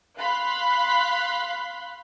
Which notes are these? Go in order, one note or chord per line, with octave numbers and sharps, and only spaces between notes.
F5 B5 C6 F#6